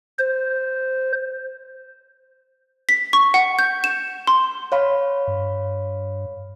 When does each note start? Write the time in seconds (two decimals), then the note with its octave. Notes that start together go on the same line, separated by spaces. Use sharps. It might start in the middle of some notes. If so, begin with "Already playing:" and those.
0.19 C5
2.89 B6
3.13 C#6
3.34 F#5
3.59 G6
3.84 E7
4.27 C6
4.72 C#5 F5 B5
5.27 G2